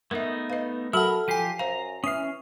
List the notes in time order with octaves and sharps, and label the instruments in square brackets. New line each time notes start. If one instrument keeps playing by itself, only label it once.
[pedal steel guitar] A3 B3 D#4 [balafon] A#4 E5
[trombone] B4 [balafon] D#5 F5
[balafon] F#3 F#4 [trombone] A4 [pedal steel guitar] A#4 B5 [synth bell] F#5 E6 F6
[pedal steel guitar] F3 G4 [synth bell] G#5 C7 D#7
[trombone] F#2 [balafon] C5 F5 [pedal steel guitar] A#5
[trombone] E3 [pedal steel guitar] C#4 F6 [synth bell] D#6 C7